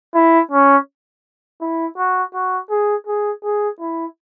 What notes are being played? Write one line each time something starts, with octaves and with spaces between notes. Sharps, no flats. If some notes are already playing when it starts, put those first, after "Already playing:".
E4
C#4
E4
F#4
F#4
G#4
G#4
G#4
E4